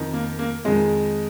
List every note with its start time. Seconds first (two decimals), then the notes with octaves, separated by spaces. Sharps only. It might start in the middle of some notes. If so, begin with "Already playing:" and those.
Already playing: F2 D#3
0.13 A#3
0.39 A#3
0.65 F2 D#3 G#3